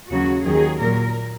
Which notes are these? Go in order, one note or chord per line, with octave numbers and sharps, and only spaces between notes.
D#2 C#3 F#3 F#4
D#2 D#3 F#3 G#4
A#2 F#3 A#4